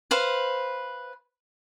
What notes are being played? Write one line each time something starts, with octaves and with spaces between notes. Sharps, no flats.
B4 C5 F5